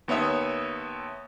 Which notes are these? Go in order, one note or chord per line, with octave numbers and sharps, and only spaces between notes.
D#2 B3 C#5 E5 D#6